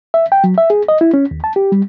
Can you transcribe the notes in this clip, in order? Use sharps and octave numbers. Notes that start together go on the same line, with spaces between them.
E5
G5
F#3
E5
G#4
D#5
E4
C#4
D#2
A5
G4
G3